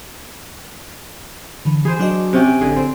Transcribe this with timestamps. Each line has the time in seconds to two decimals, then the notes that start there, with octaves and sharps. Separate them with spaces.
1.65 D3 E3
1.85 E3 G#4 C5
1.99 F#3 D4 F#4 D#5
2.33 C3 C#4 G5
2.61 A1 D3 G#4
2.76 C4